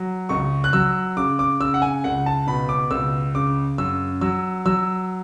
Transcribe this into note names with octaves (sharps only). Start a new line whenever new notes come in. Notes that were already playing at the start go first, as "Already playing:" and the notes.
Already playing: F#3
C#2 C#6
F#6
F#3 E6
C#3 D6
D6
C#3 E6
F#5
G#5
C#2 F#5
A5
B2 B5
D6
C#2 E6
C#3 D6
F#2 E6
F#3 E6
F#3 E6